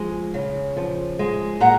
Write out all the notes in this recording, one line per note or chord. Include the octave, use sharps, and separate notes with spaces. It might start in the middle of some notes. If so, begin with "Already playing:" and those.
Already playing: F3 G#3
C#3
F3
G#3
A#2 F#5 A#5